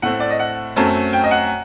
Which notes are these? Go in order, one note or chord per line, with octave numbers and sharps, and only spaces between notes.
A2 A3 C4 F#5
D5
D#5
F#5
F#2 F#3 A3 C4 A5
G5
D#5
F#5